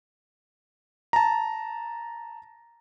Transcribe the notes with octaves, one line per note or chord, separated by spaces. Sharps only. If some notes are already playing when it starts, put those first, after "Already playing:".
A5 A#5